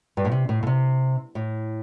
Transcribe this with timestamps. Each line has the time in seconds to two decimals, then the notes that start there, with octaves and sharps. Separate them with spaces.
0.17 G2
0.25 A2
0.32 C3
0.49 A2
0.63 A2
0.67 C3
1.35 A2